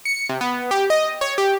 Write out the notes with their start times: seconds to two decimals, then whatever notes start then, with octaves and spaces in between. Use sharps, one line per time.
0.05 C#7
0.29 C3
0.41 B3
0.71 G4
0.90 D#5
1.21 C#5
1.38 G4